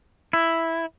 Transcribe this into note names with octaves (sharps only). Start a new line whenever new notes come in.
E4